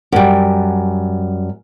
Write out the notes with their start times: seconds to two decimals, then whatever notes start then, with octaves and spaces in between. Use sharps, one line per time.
0.12 F#2 G3